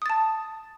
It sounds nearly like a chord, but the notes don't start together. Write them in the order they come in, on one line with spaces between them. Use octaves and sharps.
D#6 A6 A5